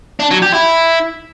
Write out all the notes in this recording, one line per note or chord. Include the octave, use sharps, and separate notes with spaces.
D4
F#3
G4
E4